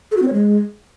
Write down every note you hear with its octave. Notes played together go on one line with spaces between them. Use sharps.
A4
F#4
C4
C#5
G#3